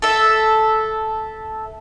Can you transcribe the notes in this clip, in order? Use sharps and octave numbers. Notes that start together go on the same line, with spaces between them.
A4 E5